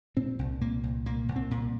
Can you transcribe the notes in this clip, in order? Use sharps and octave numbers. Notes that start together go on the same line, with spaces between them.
A#2 C4
C2
A#2 A#3
C2
A#2 A#3
C2
C4
A#2